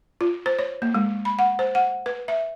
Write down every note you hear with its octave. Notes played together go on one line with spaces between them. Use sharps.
F4
C5
C#5
A#3
G#3
B5
F#5
C5
F#5
B4
E5